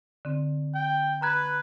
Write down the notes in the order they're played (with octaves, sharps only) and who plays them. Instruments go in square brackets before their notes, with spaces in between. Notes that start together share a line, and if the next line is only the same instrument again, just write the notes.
[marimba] D3 C4
[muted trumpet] G5
[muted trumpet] B4 [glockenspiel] A#5 F#6 G#6